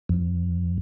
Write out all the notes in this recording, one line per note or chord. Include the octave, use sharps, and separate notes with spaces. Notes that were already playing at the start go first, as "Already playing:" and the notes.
F2